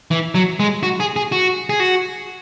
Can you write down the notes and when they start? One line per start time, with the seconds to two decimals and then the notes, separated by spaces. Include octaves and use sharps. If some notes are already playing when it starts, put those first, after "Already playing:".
0.11 E3
0.35 F#3
0.60 G#3
0.83 F#4
1.00 G#4
1.16 G#4
1.32 F#4
1.70 G#4
1.80 F#4